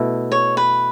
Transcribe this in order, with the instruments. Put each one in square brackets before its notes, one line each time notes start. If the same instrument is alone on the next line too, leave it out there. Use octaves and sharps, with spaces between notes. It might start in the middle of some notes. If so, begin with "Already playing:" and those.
Already playing: [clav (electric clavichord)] B2 A3 E4
[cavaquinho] C#5
B4